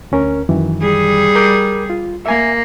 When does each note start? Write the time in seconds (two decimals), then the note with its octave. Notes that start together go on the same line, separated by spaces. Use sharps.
0.12 D2 C#4 A#4
0.49 F#2 D#3 E3
0.81 G3 G#4
1.35 A#4 D6 G6
1.90 F4
2.26 A#3 E5 G#5